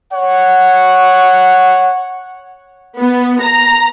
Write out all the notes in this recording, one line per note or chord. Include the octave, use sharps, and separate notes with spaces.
C#5 F#5
B3
A#5